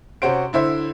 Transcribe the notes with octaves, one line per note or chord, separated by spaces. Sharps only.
C3 C#4 F#4 C5 D7
D3 E4 C5 E5